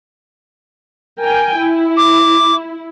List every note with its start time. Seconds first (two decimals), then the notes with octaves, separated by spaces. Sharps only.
1.20 A#4 G5 G#5
1.57 E4
1.97 D6